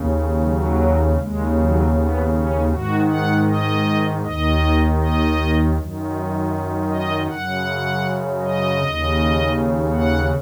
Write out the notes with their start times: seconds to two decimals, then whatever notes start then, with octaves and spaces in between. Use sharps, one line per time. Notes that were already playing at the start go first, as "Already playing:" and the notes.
Already playing: D#2 C#3
0.40 F#3
1.16 D#2 C#3 G#3
1.55 F#3
1.92 B3
2.30 C#4
2.69 G#2 D#3 F#4
3.07 F#5
3.46 D#5
4.21 D#2 D#3 D#5
4.97 D#5
5.74 F#2 D#3
6.89 D#5
7.27 F#2 C#3 F#5
8.41 D#5
8.80 D#2 C#3
9.94 F#5